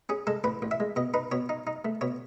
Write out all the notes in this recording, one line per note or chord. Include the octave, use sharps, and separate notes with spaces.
C#4 G#4
G#3 A4
A1 B4
A1
E5
G#3
B2 D#5
D#4 B4
B2 C#5
D#4
D#4
A3
B2 C#5